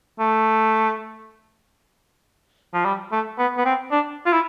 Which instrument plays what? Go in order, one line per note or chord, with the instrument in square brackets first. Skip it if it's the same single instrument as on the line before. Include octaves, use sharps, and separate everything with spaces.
[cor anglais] A3
F3
G3
A3
B3
B3
C4
D4
F4
E4